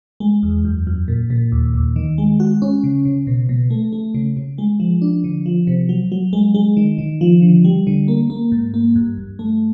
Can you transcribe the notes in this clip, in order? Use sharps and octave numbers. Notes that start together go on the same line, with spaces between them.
G#3
E2
F#2
F#2
A#2
A#2
D#2
D#2
D#3
G#3
F#4
C#4
C#3
C#3
B2
B2
A3
A3
C#3
C#3
G#3
F3
D4
D3
F3
C3
F#3
F#3
G#3
G#3
D#3
D#3
F3
D3
G3
D3
A#3
A#3
G#2
A#3
G2
G2
A3